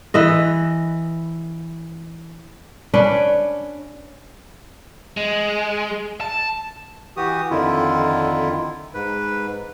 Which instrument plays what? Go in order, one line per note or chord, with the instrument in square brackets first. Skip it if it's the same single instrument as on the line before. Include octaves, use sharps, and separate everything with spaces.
[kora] E3 B4 D#5
C#4 D4 B4
[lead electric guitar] G#3
A5
[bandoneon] E3 F#4 G4 D#6
F2 D3 D#3 E4 F4
G#2 B4